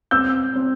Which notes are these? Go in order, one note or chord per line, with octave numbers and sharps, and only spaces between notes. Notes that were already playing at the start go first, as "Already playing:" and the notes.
C4 E6 G6
C4